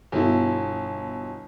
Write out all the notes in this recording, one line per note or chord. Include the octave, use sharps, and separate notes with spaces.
G1 B2 E4